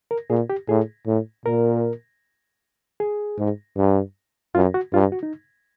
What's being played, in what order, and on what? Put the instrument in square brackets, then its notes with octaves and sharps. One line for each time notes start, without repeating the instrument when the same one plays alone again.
[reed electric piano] A#4
[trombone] A#2 [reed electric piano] G#4
[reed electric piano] G4
[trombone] A2 [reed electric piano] G#4
[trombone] A2
[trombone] A#2 [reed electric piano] A#4
[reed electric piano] G#4
[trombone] G#2
G2
[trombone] F#2 [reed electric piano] F4
[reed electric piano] F#4
[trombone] G2 [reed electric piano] F4
[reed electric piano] F#4
D#4